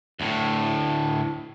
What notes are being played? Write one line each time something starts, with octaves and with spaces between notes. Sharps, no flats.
D2 A2